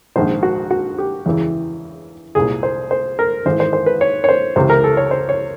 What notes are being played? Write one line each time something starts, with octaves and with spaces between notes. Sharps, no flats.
A#1 G#2 D#3 C5
F#4
F#4
G4
E2 C#3 E3
C2 A#2 G#4
C5
C5
A#4
G#1 G#2 E3 C5
C5
C5
B4
C#5
C#5
C5
C#2 C3 E3 C5
A#4
A4
C#5
C5
C#5